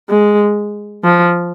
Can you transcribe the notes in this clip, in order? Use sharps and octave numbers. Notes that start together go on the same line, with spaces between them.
G#3
F3